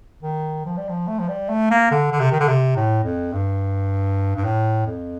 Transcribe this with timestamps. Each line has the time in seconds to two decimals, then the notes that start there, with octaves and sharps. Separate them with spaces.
0.23 D#3
0.65 F3
0.77 G3
0.89 F3
1.08 A3
1.19 F3
1.28 G3
1.49 A3
1.71 A#3
1.91 D3
2.12 D3
2.20 C3
2.32 D#3
2.40 D3
2.48 C3
2.76 A2
3.04 F2
3.33 G2
4.36 G2
4.45 A2
4.87 F2